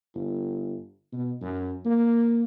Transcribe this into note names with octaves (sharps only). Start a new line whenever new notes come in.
G1
B2
F#2
A#3